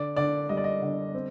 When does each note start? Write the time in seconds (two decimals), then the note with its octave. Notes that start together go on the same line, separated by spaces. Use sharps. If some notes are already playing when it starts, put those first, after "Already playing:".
Already playing: D3 D5
0.16 D3 D5
0.49 G3 D#5
0.57 D5
0.64 D#5
0.82 D3
1.14 C4